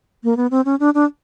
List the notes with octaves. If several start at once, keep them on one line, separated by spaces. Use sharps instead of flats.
A#3
B3
C4
C#4
D4
D4